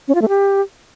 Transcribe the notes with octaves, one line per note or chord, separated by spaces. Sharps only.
C#4
F4
A3
G4